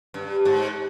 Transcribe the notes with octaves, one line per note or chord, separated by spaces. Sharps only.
G2
G#2